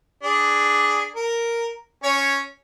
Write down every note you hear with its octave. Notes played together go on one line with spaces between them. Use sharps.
D4 G#4
A#4
C#4 C#5